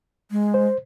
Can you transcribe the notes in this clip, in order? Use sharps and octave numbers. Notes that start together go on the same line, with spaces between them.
G#3
C5